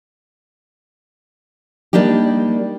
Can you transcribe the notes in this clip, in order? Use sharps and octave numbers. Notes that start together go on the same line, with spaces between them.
G3 A#3 D4 D#4 G4